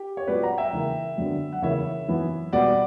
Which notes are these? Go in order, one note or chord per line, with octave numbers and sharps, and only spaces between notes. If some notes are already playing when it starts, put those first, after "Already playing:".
Already playing: G4
C#5
A#2 F#3 B3 B4 D5
F#5 A#5
E5 G5
C#3 E3 A#3
F#2 D3 F#3 B3
F#5
C#3 E3 A#3 C#5 E5
F#2 E3 B3
B2 G3 B3 D5 F#5